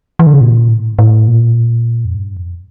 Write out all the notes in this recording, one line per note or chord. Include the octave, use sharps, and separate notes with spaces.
E3
D3
C#3
A#2
A2
A2
A#2
F2
G2
F2